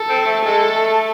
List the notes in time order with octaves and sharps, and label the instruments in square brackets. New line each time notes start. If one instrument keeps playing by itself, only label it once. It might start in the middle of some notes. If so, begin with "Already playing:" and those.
Already playing: [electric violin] A4
[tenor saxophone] C4
A3
[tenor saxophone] G#3 [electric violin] A4
[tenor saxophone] A3